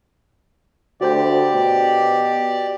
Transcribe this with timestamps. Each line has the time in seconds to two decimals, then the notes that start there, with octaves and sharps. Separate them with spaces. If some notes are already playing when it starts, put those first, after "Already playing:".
1.01 D2 F#4 G4 C5 D5 G5
1.54 B2